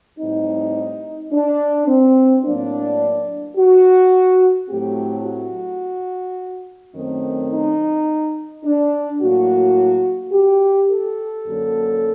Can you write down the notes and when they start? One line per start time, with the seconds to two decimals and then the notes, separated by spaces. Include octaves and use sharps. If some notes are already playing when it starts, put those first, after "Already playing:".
0.19 A2 G3 C4 D#4
1.32 D4
1.88 C4
2.45 A2 F#3 A#3 D4
3.57 F#4
4.69 A2 F#3 A3 C4 G4
5.25 F#4
6.94 F#2 D#3 A3 C4
7.52 D#4
8.64 D4
9.20 A2 F#3 A#3 F#4
10.32 G4
10.90 A4
11.45 F#2 D3 F#3 A#3